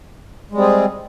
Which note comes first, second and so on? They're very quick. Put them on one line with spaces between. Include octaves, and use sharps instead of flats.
G#3 G3 C4 G#4